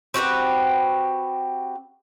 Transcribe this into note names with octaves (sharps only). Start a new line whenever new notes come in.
C4 F#4 G4 B4